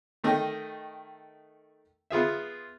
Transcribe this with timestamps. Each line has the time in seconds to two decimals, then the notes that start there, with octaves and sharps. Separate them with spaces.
0.24 D#3 A3 D#5 G5
2.10 B3 F4 G#4 E5